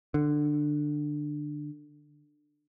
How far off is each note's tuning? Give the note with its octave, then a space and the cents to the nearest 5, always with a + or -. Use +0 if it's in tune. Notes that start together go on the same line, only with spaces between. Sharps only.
D3 +15